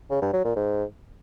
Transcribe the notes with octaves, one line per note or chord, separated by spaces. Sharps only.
C#3
G2
F#3
A#2
G#2